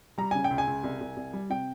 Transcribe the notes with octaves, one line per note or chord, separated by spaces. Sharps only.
G3 A#5
C#3 G#5
G5
C#2
G#5
C#2
C2
C2
C2
G3
C3 G5